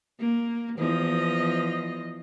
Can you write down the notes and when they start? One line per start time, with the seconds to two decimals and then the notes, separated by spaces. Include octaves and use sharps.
0.19 A#3
0.78 E2 F3 D#5